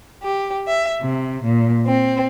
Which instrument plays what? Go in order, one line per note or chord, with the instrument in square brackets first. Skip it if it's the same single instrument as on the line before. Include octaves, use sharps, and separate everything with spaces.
[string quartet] G4
E5
C3
A#2
C4